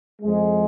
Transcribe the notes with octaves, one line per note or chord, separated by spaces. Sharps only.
F2 F3 G#3